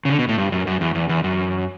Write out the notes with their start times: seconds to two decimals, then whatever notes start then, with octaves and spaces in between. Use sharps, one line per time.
0.05 C#3
0.10 D3
0.19 B2
0.29 A2
0.38 G2
0.52 F#2
0.67 F#2
0.81 E2
0.95 E2
1.09 E2
1.24 F#2